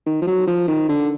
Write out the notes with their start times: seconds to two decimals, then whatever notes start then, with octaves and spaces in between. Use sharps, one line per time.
0.06 D#3
0.22 F3
0.27 F#3
0.47 F3
0.67 D#3
0.88 D3